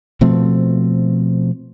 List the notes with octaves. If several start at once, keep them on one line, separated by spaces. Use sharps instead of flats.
B2 F3 A3 C4